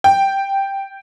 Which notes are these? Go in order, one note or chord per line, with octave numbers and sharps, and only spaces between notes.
G5